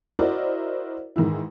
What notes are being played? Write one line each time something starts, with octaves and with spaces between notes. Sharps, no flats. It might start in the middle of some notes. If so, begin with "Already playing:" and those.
E4 F#4 A#4 C5 D5 D#5
G#2 D#3 E3 E4